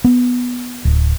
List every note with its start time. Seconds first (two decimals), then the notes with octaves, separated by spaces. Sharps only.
0.04 B3
0.85 D1